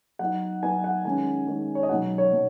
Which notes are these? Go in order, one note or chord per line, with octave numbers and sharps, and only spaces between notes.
F#3 B3 D#4 F#5
F#3 B3 D#4 G#5
F#5
D#3 G#3 C#4 G#5
D#3 G#3 C#4
C#5
D#5
B2 F#3 D#4 F#5
C#5
B2 F#3